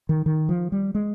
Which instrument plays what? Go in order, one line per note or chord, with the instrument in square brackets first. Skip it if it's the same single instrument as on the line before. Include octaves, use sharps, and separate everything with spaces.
[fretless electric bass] D#3
D#3
F3
G3
G#3